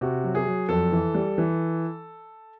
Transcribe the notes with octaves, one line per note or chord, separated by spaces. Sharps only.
C3 F#4
F#3
G#4
F#3
F2 A4
E3
G3
E3